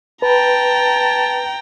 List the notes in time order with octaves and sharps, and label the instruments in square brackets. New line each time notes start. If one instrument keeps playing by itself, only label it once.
[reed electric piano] B4 [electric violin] G5 A#5 [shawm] A5